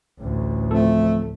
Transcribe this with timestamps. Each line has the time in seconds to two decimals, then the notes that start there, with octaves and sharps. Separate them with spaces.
0.19 A1 D2
0.71 F3 A3 C4 A4